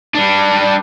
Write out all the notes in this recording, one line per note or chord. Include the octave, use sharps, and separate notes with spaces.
G3 D4